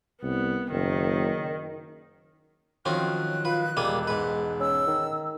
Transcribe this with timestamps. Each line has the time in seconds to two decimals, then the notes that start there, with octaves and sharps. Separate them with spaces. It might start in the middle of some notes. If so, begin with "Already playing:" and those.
0.23 C2 B3
0.71 F#1 D#3
2.85 D#3 F3 F#3 C4 C#4 F4 F#6
3.45 F4 B4
3.77 E1 G3 G#3 A#3 D#6
4.07 G#2 G#3 B4
4.60 C#4 E6
4.87 D#3